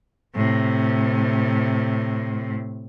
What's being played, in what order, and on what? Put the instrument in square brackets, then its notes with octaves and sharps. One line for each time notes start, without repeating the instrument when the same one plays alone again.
[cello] A2 C3